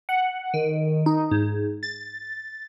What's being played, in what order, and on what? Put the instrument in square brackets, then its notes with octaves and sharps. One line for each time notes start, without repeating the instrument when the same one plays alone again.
[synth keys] F#5
D#3
D#4
G#2
A6